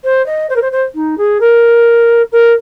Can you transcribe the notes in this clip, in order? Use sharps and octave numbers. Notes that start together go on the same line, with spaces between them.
C5
D#5
C5
A#4
C5
C5
D#4
G#4
A#4
A#4